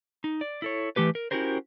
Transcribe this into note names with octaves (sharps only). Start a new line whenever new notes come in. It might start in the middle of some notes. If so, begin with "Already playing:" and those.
D#4
D5
E4 A4 C#5
E3 A3 G4 B4
A#4
C#4 E4 F#4 G4 A#4 C5